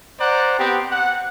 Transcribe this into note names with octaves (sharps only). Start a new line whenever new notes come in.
C5 D5 F#5 A#5
B3 C4 G4
F#5